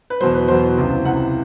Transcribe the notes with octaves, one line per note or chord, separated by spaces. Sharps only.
B4
E2 B2 F#3 C5
B4
E2 B2 F#3 C5
C#2 C3 E3
C#2 C3 E3 F#5